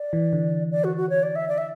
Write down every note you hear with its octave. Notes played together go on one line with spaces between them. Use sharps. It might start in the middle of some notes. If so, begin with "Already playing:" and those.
Already playing: D5
E3
D3
D5
F#4
F#4
C#5
D5
E5
D5
E5